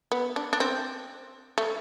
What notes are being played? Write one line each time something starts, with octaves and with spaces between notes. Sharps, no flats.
B3
D4
D4
C4
A3